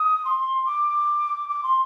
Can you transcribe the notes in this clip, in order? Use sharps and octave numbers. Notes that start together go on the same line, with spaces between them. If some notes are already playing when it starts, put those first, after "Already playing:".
Already playing: D#6
C6
D6
D6
C6